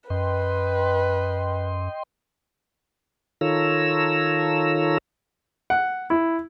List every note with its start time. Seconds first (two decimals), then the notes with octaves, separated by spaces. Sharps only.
0.10 F#2 B4 D#5 G5 C6
3.41 D#3 F4 A4 C#5 A#5 E6
5.70 F#5
6.10 E4